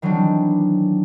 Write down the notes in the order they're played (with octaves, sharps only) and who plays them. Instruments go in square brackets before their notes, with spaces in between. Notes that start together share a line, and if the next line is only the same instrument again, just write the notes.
[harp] D#3 E3 F#3 G3 C4 D4